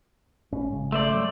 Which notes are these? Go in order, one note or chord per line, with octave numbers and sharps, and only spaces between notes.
G#1 A2 C#4
G#1 C#3 G#3
A3 C5 D5
F#3 G3